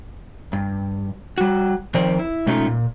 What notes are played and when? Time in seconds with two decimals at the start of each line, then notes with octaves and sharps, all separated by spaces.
0.53 G2
1.38 G3 F#4
1.94 D#3 F3 C4 A#4 C5 D5
2.19 E4
2.46 B2 G#3 A3 C#4 D#4 F4
2.66 A#2